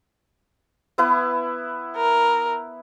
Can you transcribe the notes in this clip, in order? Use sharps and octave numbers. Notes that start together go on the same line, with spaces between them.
B3 E4 B4
A#4